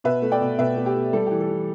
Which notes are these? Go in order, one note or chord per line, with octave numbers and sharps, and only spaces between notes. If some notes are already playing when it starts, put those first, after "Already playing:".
B2 B4 E5
A3
D5 G5
B2
B2 B4 E5
A3
G4
A3
G3 A4
E3 G4
A4
E3